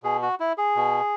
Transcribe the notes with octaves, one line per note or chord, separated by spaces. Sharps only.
B2 G#4
F#4
E4
G#4
B2